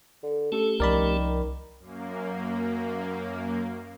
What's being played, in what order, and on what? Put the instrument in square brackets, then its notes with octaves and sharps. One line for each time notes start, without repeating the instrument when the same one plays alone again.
[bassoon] D3
[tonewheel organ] A3 C#4 G4 [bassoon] A4
[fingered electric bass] C2 F3 [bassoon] D#3 [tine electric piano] A#4 D5 B5
[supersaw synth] F#2 A#3